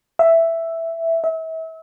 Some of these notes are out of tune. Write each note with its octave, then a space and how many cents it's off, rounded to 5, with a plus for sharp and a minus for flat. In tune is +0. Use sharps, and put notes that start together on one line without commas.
E5 +5
E5 -35